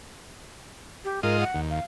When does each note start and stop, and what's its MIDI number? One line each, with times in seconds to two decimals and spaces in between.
1.05 1.22 67
1.23 1.45 44
1.23 1.45 65
1.23 1.39 70
1.23 1.45 75
1.40 1.60 78
1.55 1.80 39
1.70 1.83 77